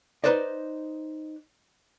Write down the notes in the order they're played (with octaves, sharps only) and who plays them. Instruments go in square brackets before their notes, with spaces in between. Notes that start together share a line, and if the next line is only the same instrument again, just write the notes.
[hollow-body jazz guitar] D#4 G4 B4 C5 D5 D#5